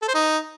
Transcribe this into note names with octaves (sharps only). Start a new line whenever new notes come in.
A4
C5
D#4